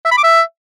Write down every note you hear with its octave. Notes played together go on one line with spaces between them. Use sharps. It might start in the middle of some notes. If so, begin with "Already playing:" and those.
E5
B5
D6
E5